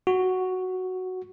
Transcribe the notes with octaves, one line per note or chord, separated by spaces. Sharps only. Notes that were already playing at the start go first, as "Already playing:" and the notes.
F#4